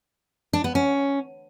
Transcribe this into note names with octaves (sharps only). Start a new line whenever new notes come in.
D4
B3
C#4